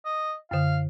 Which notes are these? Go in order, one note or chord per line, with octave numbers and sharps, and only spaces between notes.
D#5
F#2 D3 F5